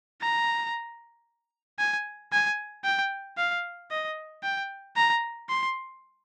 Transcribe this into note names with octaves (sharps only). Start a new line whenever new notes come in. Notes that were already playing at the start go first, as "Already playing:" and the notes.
A#5
G#5
G#5
G5
F5
D#5
G5
A#5
C6